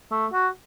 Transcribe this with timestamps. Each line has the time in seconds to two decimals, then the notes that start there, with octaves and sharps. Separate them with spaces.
0.11 A3
0.33 F#4